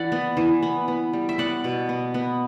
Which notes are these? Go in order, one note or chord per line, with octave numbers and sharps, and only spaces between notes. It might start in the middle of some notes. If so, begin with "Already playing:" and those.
Already playing: E3 D5 F#5
B3
E3
B3
B3
G3
E5
B3 D5 F#5
B2
B3
B3